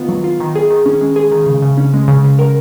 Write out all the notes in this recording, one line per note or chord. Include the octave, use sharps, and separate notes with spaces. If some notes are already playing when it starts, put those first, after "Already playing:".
Already playing: D#3 B3 F4
F#3
F4
D#3
G#4
D#3
C#4
G#3
G#4
D#3
C#3
C#3
C#4
G#3
C#3
C#3
A#4